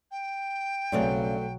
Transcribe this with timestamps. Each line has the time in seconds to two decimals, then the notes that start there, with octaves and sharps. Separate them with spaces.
0.11 G5
0.92 B1 G2 C#3 F#3 A3 C4